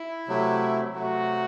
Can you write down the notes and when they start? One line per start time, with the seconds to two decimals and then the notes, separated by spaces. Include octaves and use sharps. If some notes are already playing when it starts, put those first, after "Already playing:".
Already playing: E4
0.28 C3 F#3 A3
0.94 C3 F#3 A3 F#4